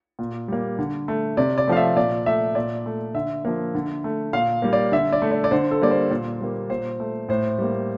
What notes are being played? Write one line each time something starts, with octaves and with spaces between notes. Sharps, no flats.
A#2
G3 A#3
D3
A3
C3 D5
D5
F3 A3 F5
E5
A#2 D5
A3 E5
A#2 D5
A3
D3 E5
F3 A#3
D3
A3
A#2 F5
G3 A#3
D5
D3 E5
D5
A3
D5
D5
D3 C5
A4
G3 A#3 D5
C5
A#2 C5
G3 A#3
A#2 C5
A3
A2 C5
G3 A#3